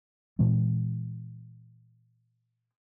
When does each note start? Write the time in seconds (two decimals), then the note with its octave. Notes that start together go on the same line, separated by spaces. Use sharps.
0.39 A#2 E3 G#3 C4